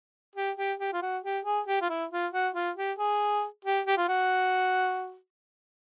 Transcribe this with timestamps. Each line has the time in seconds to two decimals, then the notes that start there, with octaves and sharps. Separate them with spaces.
0.35 G4
0.58 G4
0.79 G4
0.93 F4
1.02 F#4
1.24 G4
1.45 G#4
1.67 G4
1.82 F4
1.89 E4
2.11 F4
2.33 F#4
2.55 F4
2.77 G4
2.99 G#4
3.65 G4
3.87 G4
3.98 F4
4.09 F#4